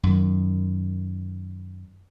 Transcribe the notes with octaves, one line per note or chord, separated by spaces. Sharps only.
F#2 D#3